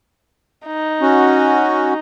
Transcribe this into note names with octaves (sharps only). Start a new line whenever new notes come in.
D#4
C#4 F#4